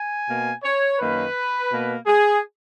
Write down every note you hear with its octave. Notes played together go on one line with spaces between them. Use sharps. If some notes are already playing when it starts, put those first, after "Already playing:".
Already playing: G#5
B2 A#3
C#5
F#2 D#3 A#3 B4
B2 A#3
G#4